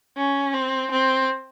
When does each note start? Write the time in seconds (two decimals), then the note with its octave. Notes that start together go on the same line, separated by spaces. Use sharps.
0.17 C#4
0.54 C4
0.91 C4